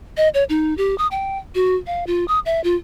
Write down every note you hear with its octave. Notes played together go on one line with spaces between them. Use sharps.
D#5
C#5
D#4
G4
D#6
G5
F#4
F5
F4
D#6
E5
F4